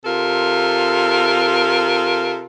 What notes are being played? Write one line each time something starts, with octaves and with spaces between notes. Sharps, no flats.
C3 F4 A4 A#4